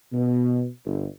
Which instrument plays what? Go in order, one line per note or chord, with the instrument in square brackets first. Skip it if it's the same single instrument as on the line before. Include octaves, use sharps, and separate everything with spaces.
[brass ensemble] B2
G1